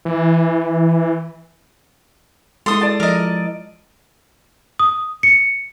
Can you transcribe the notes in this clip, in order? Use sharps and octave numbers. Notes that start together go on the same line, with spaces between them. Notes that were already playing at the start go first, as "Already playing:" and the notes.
E3
G#3 E4 A4 C6 D#6
D5 A5
F3 A#4 D#5
D#6
C#7